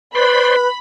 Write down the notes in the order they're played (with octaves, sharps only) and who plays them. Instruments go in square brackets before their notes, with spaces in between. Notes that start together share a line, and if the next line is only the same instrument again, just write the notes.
[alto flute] B4 [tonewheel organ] C5 D5 C6 [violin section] B5